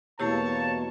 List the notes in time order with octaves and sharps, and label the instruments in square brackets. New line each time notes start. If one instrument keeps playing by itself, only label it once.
[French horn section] E2 B2 A#3 [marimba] A3 E4 G4 [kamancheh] C#5 [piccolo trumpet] A5